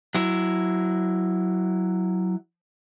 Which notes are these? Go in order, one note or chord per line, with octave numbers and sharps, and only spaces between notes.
F#3 E4